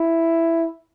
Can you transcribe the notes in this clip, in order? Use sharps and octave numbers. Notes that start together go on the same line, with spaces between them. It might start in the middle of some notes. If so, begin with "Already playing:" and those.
Already playing: E4